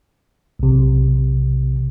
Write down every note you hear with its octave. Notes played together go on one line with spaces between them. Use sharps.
B1 C3